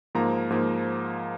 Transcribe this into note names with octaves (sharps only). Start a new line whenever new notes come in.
G#2 F3 A#3 A#5
G#2 F3 A#3